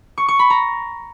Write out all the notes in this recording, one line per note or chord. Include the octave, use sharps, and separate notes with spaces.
C#6
C#6
B5
A#5